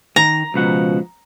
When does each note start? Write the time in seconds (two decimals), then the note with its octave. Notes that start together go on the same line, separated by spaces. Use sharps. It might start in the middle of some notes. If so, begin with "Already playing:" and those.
0.16 D#3 A#5
0.54 C#2 B2 F3 F#5